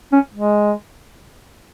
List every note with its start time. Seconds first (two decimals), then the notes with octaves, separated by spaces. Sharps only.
0.13 C#4
0.34 G#3